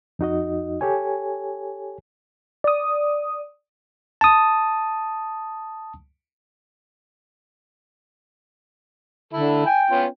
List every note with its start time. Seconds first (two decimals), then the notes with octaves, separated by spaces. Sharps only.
0.19 F2 D#4 F#4 D#5
0.81 G4 A4 C#5 G#5
2.64 D5 D#6
4.21 A5 D#6
9.33 D3 E4 A4
9.66 G5 G#5
9.90 B3 C#4 F4